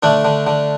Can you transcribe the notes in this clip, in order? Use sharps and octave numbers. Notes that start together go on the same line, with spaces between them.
D3 A3 D4
D3
D3